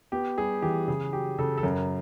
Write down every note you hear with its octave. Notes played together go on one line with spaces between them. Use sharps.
B3 G4
G3 G#4
E3 G4
C#3 G#4
F#3 G4
C#3 A4
A4
F#2 A#4